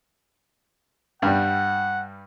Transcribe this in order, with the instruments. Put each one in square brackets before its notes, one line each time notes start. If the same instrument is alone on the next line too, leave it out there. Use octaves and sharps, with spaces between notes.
[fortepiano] G2 G3 [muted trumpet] F#5